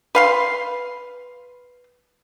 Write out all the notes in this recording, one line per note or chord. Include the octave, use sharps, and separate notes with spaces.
B4 F5 C6